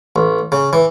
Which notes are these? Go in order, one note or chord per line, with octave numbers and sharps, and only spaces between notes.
A1
C#3
E3